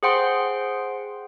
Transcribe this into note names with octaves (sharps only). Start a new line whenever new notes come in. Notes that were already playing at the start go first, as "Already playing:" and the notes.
G#4 C5 F#5 G5 C6